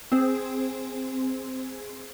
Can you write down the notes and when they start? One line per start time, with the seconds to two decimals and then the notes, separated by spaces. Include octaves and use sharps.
0.12 C4 G#4 C5